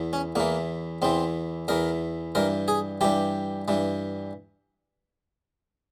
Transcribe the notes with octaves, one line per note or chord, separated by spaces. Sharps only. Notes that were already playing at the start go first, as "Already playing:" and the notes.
Already playing: E2 E3
C#4
E2 E3 A#3
E2 E3 C4
E2 E3 A#4
G2 E3 A#4
G#4
G2 E3 G4
G2 E3